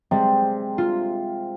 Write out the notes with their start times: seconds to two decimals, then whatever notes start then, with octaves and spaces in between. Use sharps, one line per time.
0.11 C3 G3 G#3
0.78 F4